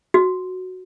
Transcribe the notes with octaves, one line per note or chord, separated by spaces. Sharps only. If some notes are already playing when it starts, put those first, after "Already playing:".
F#4